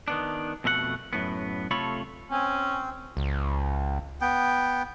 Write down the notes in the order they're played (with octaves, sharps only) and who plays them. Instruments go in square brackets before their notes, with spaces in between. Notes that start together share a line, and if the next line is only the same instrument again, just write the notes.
[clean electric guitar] D#3 B3 D4
F2 B2 A3 F4 F#5
F#2 A2 B3
C3 A3 F4 A4 C#5 B5
[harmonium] C4 [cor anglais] C#4 [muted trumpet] G#5
[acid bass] C#2
[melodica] B3 G5